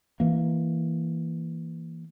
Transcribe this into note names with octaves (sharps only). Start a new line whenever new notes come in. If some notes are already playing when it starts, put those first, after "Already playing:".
E3 A#3